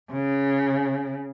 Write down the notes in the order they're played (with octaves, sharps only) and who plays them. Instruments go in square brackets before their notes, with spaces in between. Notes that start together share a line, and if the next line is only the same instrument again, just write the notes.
[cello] C#3